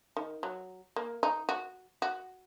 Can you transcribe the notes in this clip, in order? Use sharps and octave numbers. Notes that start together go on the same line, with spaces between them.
D#3
F#3
A#3
D#4
F#4
F#4